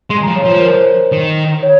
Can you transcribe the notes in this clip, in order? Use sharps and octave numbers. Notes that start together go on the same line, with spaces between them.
G#3 C6
G#5
A#5
F3
C#5
F3 C5
A#4
C5
D#3
C#5